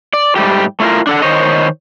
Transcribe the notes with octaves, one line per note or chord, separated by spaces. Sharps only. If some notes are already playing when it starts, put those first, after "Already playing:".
D5
G#2 G3 A3 G4
A3 E4 F4 A#4
D4 A4 F#5
D#3 C5 C#5 D#5